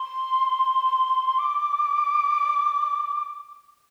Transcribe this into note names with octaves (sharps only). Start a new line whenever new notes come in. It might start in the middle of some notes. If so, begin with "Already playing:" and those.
Already playing: C6
D6